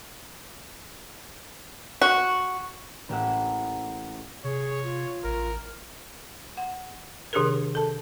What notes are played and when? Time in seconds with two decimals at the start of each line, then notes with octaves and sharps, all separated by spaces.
2.01 F#4
3.09 A1 A#3 G4 E5 F#5 E6
4.44 C3 G#4 C#5
4.84 F4
5.24 A1 A#4
6.57 F#5
7.33 C3 D#3 D4 G4 G#4 A#4
7.75 A4 A5